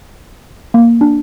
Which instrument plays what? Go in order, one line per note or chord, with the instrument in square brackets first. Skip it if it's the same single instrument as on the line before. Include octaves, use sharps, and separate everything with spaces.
[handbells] A#3
D4